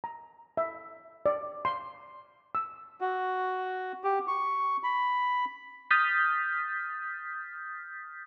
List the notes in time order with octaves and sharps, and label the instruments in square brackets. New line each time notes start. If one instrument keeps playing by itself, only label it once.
[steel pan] A#5
E5
D5
C6
E6
[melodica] F#4
G4
C#6
B5
[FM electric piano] D#6 F6 G6 A6 B6